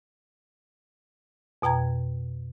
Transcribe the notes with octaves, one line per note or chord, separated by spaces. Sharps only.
F2 B2 G5 A#5 G#6